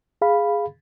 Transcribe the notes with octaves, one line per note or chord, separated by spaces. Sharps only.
G#4 F5 B5